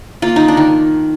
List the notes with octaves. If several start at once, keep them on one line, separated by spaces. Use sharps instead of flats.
A#3 F4
D#3 D#4
D4
D#3